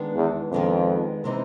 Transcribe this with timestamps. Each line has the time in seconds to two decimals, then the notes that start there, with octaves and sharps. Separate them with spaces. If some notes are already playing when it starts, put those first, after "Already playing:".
Already playing: D#3 G#3 B3 D4
0.16 E2
0.51 F2 D#3 G#3 B3 D4
1.24 C3 E3 G#3 C4 D#4